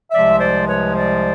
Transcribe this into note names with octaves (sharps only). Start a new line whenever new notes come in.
C2 C3 F3 G#3 D5 E5
C5 D5
B4 C#5
C5 D5